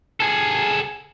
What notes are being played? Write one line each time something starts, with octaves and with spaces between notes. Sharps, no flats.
G#4 A4